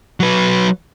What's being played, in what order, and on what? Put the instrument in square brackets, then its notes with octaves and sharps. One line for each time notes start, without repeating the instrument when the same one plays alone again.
[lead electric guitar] F#3 B4